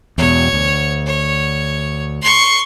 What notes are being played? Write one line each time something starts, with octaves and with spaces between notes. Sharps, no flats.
E2 B2 C#5
D2
C#5
C6 C#6